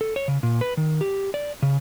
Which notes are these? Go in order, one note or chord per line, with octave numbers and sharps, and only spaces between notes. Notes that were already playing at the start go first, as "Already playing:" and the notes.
A4
C#5
C#3
A#2
B4
D#3
G4
D5
C#3